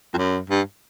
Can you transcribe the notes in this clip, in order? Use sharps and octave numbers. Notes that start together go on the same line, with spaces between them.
F2
F#2
G2